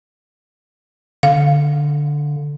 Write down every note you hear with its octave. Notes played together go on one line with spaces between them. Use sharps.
D3 F5